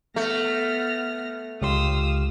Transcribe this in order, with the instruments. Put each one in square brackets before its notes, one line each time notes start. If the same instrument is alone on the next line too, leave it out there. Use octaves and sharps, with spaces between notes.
[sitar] A3 [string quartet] B3 F6 A#6
[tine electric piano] C#2 G4 C6 [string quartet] F5 D#6 E6